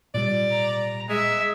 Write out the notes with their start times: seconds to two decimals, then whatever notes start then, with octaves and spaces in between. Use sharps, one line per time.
0.14 A#2 G3 D5
0.51 A#5
1.09 G#3 E5